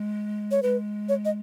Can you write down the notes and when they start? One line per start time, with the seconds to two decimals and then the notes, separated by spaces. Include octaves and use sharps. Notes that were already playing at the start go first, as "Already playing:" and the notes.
Already playing: G#3
0.51 C#5
0.63 G#3 B4
1.09 C#5
1.25 D#5